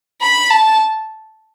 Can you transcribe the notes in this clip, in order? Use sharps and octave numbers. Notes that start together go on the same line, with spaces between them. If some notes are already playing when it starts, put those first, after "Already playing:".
B5
A5